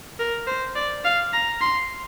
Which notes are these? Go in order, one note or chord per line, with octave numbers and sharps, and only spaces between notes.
A#4
C5
D5
F5
A#5
C6